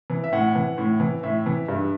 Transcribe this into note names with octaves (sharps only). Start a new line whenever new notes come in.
E3
E5
A2 F#5
E3
A2
E3
A2 E5
E3
G2